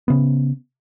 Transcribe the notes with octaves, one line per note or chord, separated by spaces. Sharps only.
C#3 B3